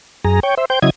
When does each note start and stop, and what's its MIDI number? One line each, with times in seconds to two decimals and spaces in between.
0.24 0.40 42
0.24 0.40 68
0.24 0.40 82
0.43 0.55 73
0.43 0.55 79
0.57 0.65 72
0.57 0.65 76
0.70 0.79 72
0.70 0.79 79
0.70 0.79 91
0.82 0.90 49
0.82 0.90 54
0.82 0.90 64
0.82 0.90 75
0.82 0.90 92